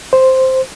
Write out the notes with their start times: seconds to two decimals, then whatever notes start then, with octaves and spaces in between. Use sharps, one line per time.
0.13 C5